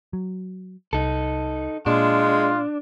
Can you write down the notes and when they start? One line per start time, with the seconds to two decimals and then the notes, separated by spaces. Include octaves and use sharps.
0.13 F#3
0.93 C2 D#4 A4
1.86 A#2 G#3 D4 F4